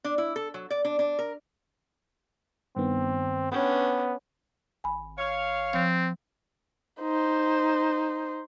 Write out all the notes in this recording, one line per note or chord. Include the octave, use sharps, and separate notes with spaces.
D4
E4
A4
F#3
D5
D4
D4
A#4
G2 D#3 B3 C4
B3 C#4 D4 B4 G5
G#1 G#5 B5
C#5 F5
F3 C4
D#4 C5